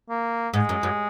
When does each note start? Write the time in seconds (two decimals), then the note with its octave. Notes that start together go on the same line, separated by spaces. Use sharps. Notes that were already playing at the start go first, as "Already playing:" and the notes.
0.09 A#3
0.54 G#2 G#3
0.69 F#2
0.83 F#2